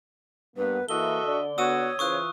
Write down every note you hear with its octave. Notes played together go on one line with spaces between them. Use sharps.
G2 A#3 B3 B4
E3 A#3 E4 F#4 A4 D#5 E5 G7
D3 D5
B3 F#4 C#5 D#6 E6 D#7
C#3 E3 F4 C5 C#6 D#6 F#6